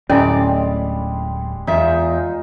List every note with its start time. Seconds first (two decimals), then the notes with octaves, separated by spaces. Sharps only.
0.10 D1 A2 G3 G#3 C#4 E4 D5
1.67 E2 D#4 F4 E5